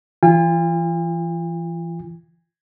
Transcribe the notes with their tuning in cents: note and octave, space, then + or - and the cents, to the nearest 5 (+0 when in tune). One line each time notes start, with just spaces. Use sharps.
E3 +25 F4 -30 G#5 -45